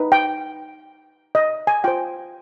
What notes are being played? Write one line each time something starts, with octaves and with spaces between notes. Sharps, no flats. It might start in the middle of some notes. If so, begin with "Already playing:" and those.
Already playing: D#4 B4
G5
D#5
G#5
F4 C5 G5